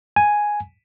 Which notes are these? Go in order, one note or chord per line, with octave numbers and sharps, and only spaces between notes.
G#5